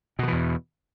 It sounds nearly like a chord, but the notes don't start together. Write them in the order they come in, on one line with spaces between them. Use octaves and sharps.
B2 D#3 E3 E2